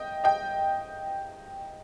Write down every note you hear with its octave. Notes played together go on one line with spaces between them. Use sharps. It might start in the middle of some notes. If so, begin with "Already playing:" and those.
Already playing: D#5 G5
D#5 G5